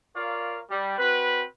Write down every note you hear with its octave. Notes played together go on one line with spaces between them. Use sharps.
F4 A#4 C#5 D5 F5
G3
C4 F#4 B4